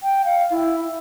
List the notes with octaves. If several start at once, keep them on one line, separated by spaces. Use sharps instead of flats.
G5
F5
E4